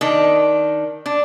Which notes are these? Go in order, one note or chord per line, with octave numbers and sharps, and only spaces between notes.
D#3 D4
D4